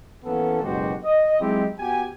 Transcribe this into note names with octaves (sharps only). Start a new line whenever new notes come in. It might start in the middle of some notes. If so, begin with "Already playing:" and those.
E3 A#3 B3 C#4 A4
F#1 B2 G#3 F#4 G4 C5
D#5
F#3 G#3 C4 D#4 E4 G4
B3 F#4 G4 G#5